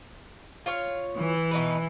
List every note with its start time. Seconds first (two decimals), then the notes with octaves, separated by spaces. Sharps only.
0.66 F4 C#5 F5
1.17 E3
1.51 B2 D#4 B4